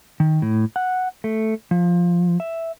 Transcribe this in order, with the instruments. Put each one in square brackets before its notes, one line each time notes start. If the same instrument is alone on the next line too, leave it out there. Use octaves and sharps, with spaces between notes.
[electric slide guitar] D#3
A2
F#5
A3
F3
E5